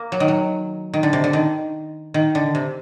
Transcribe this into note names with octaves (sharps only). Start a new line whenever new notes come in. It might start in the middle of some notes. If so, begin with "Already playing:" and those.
Already playing: A#3
F#3
D#3
F#3
D#3
D3
C3
D3
D#3
D#3
D3
C3